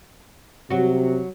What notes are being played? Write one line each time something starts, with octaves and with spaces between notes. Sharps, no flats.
C3 F#3 F#4